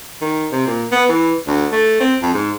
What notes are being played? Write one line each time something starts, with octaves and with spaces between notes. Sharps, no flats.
D#3
C3
A#2
B3
E3
D2
A3
C4
F2
G#2